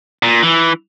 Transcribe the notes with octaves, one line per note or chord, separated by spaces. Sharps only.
A#2
E3